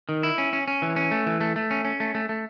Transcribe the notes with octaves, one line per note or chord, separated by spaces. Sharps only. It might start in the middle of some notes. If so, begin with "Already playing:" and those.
D#3
E4
C#4
C#4
C#4
E3
C#4
A3
E3
A3
A3
C#4
C#4
A3
A3
A3